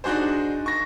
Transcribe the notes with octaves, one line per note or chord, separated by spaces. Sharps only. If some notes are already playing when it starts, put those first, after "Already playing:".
D4 D#4 F#4 G#4 C5
C#6 A#6